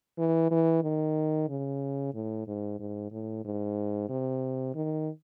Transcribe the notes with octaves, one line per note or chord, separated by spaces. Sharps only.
E3
E3
D#3
C#3
A2
G#2
G#2
A2
G#2
C3
D#3